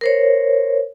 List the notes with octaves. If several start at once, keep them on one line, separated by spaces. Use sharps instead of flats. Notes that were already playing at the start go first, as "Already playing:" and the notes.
A#4 C5 C#5